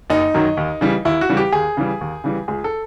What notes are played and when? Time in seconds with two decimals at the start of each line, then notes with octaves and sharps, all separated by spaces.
0.10 F#1 D#4
0.34 F#2 D#3 F#3
0.57 D#2
0.81 C#3 E3 G3
1.05 D#2 E4
1.21 F#4
1.29 C#3 E3 G3
1.37 G4
1.52 D#2 G#4
1.77 C#3 E3 G3
2.01 D#2
2.24 C#3 E3 G3
2.48 C#2 G#4
2.64 A4